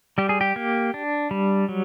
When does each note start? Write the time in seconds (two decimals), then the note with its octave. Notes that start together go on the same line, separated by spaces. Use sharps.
0.18 G3 G4
0.29 G#4
0.41 G4
0.56 A#3
0.94 D4
1.31 G3
1.69 F#3